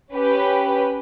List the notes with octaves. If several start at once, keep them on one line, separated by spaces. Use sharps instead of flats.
C#4 G4 B4